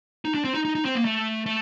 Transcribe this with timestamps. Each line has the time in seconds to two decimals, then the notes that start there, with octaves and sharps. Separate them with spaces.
0.25 D#4
0.34 D4
0.44 C4
0.54 D#4
0.65 D#4
0.75 D#4
0.85 C4
0.95 A#3
1.05 A3
1.46 A3